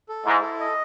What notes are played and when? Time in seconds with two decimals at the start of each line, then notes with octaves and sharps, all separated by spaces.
0.09 A4
0.26 G#2 E4
0.42 A4
0.60 D#5